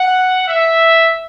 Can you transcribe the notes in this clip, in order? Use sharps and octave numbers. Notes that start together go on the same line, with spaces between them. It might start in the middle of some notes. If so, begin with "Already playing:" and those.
Already playing: F#5
E5